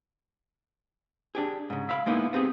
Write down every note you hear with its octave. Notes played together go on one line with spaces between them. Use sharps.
D4 G4 G#4
G#2 C#3
E5 F5 B5
G#3 A#3 B3 D#4 E4
B3 C4 G4 G#4